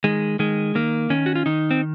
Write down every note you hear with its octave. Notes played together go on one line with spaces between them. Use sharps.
D#3 G#3
D#3 G#3
D#3 A#3
D#3 C#4
F#4
F4
D#3 D#4
C4